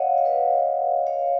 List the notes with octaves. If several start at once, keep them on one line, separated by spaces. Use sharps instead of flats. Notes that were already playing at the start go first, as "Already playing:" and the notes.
Already playing: C#5 D#5 F5 F#5
F5
B4 D#5
C#5 F5